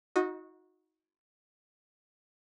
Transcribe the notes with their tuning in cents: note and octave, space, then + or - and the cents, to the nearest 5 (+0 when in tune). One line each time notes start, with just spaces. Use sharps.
D#4 +30 F#4 -20 D#5 +0